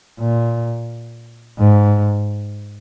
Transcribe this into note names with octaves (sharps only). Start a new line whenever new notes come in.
A#2
G#2